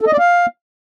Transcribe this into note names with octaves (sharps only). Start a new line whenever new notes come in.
A4
D#5
D5
F5